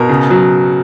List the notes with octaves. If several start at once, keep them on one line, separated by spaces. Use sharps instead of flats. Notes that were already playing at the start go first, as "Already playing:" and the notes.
Already playing: B2 A#4
C#3
F#3